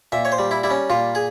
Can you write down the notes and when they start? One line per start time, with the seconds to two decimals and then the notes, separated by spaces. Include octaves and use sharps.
0.12 A#2 E5
0.25 C#5
0.32 C5
0.38 G3
0.51 E4
0.63 G3 E4
0.70 C#4
0.90 A#2 F4
1.15 G#4